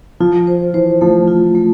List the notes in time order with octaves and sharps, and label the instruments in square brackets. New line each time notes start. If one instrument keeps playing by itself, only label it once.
[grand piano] F3 [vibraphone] F4
[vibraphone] C5
[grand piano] E3 [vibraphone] C5
[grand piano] F3 [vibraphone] A3
[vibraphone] F4
A3